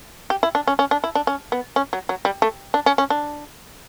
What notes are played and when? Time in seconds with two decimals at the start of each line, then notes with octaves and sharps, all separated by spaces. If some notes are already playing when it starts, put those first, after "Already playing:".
0.30 G4
0.43 E4
0.55 D4
0.67 C#4
0.79 C#4
0.91 D4
1.04 E4
1.15 D4
1.27 C#4
1.52 B3
1.76 C#4
1.93 F#3
2.09 F#3
2.25 G3
2.42 A3
2.74 D4
2.86 C#4
2.98 C#4
3.10 D4